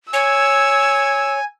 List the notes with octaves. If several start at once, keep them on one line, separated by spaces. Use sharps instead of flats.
C#5 G#5 E6